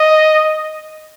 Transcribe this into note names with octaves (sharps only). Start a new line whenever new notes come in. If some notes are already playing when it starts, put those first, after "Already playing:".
Already playing: D#5